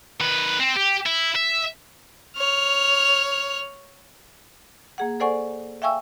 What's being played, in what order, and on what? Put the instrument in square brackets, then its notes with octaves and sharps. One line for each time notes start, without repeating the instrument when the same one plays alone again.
[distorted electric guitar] D#3 B4
C4
G4
E4
E5
[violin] C#5 F6
[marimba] A#3 G#4 F#5
A4 C5 D5 F#5 G#5 C#6
E5 F5 G5 G#5 C#6 E6